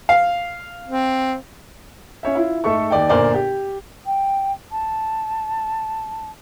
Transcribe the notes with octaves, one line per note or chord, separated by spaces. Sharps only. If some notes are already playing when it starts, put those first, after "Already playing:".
F5
C4
C#4 C#5 E5
E4 F4
G#2 A3 A4 E5 C#6
D#2 D5 G5
G1 A#2 A#4 C5 D5 G#5
G4
G5
A5